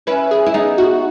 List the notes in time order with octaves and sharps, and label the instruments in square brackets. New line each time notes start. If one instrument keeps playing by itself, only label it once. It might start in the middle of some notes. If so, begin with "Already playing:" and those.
[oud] C#4 E4 [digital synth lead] B4
[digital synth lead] G#4
[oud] E4
[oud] B3 D#4 [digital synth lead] G#4
[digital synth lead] F#4